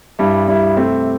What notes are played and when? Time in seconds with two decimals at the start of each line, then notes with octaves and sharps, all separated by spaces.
0.19 G2 G3 E4
0.48 G2 G3 E4
0.76 C3 A3 C4